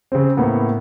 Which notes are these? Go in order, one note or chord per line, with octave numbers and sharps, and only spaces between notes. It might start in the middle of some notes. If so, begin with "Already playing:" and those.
C#3 C4
A2 A#3 B3